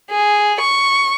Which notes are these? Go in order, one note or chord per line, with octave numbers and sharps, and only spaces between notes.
G#4
C#6